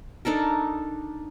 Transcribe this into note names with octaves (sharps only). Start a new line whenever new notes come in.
D4 D#4 A4 A#4